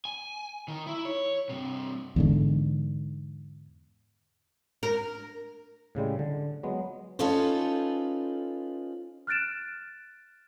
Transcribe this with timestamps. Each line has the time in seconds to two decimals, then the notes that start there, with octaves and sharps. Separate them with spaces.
0.05 G#5
0.69 D#3
0.87 E4
1.05 C#5
1.49 G2 C3
2.16 E2 G#2 D3
4.83 A#4
5.95 A2 C#3 G3 G#3
6.19 D3
6.63 F#3 G#3 B3
7.19 C#4 D#4 F4 A4 B4 C5
9.27 F6 F#6 A6 D7 E7